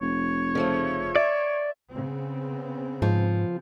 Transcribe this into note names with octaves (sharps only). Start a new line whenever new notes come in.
F1 C#5
C#3 F3 A3
D5 E5
C#3 B3 C4
G#2 F3